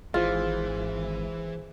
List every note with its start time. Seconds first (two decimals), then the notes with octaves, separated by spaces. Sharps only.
0.14 G#1 E3 F4 G#4 C5